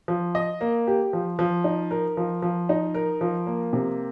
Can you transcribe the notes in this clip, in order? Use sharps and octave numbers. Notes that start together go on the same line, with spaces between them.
F3
D#5
A#3
G4
F3
F3
D#4
A#4
F3
F3
D#4
A#4
F3
A#3
C3